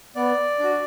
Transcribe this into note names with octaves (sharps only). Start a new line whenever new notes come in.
B3 D5
D4 F#4